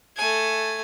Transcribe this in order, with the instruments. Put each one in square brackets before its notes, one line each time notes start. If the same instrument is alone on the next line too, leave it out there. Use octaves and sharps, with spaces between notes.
[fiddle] A3 G#5